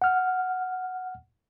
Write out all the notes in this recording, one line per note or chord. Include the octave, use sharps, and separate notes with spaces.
F#5 F6